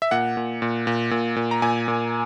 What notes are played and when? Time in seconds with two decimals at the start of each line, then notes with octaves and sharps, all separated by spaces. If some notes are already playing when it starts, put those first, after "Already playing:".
0.02 E5
0.11 A#2 F#5
0.37 A#2
0.62 A#2
0.87 A#2
1.11 A#2
1.36 A#2
1.51 A#5
1.62 A#2 G#5
1.88 A#2